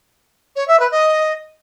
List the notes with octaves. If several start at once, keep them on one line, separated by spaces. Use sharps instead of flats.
C#5
E5
B4
D#5